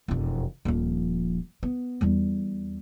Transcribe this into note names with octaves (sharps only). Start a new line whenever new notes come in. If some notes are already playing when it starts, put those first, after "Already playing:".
E1 F2
D#1 F3
B3
E2 G3